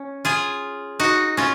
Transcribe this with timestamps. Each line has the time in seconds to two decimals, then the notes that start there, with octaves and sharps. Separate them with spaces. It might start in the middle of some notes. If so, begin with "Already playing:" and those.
Already playing: C#4
0.25 F4 G#4
1.00 D#4 F#4
1.37 C#4 F4